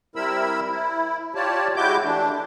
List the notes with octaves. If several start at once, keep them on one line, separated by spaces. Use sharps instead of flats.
G3 C4 E4 A#4 B5 E6
E4
F4 G4 C#5 D5 A5
G#3 E4 F#4 G4 D6 G6
E3 A3 D4